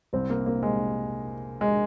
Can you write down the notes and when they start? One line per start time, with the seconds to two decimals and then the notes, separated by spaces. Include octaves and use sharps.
0.13 C2 C3 G3 C4
0.30 A#3
0.46 A#3
0.63 G#3
1.61 G#3